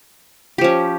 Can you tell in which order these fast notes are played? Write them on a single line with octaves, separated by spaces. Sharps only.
G4 F3 C#4